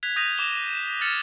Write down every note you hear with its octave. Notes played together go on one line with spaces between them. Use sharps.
F#6 G#6 B6 F7
D#6 G6 A#6 D#7 F7
D6 E7 F7 G7
E7
F6 A6 C#7 F#7